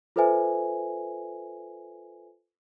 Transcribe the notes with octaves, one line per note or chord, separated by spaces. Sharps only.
F4 A4 B4 C5 E5 G#5